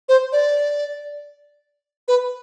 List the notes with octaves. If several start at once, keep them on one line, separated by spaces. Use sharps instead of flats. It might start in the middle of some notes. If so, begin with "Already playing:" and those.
C5
D5
B4